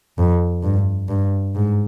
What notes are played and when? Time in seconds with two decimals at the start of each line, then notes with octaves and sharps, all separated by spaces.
0.18 F2
0.63 G2
1.09 G2
1.55 G#2